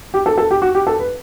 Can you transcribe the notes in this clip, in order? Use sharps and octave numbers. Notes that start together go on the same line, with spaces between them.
G4
A4
A4
G4
F#4
G4
A4
B4